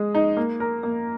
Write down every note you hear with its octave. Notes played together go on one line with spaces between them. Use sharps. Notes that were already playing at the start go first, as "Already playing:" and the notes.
Already playing: G#3 G#4
D#4
A#3
A#4
A#3